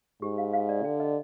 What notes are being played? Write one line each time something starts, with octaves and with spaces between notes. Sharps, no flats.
G#2 G4
F5
F5
D5
D3 G5
D#5